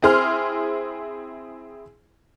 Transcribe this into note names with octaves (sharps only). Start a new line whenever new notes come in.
C4 E4 G#4 C6 F6